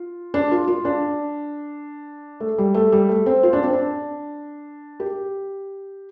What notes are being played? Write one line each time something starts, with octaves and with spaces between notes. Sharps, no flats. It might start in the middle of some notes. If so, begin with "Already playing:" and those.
Already playing: F4
D4
F4
F4
D4
A3
G3
A3
G3
A3
C4
F4
D4
C4
D4
G4